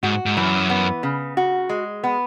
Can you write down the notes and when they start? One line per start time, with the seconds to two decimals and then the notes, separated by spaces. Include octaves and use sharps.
0.03 G#2 F#4
0.26 G#2
0.37 F#2 E3
0.70 B3
1.03 C#3
1.37 F#4
1.69 G#3
2.04 B3